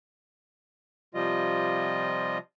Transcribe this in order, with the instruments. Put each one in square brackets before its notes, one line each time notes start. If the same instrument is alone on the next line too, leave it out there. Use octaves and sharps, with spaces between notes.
[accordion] C3 F3 G3 F4 D#5